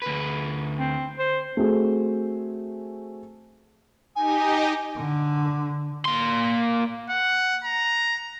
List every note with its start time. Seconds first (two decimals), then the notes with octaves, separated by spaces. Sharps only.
0.02 D2 B4
0.79 C4
1.19 C5
1.57 A3 C4 F#4 G#4
4.16 D#4 G4 D#5 G#5
4.98 D3
6.05 A#3 C6
7.10 F#5
7.64 A#5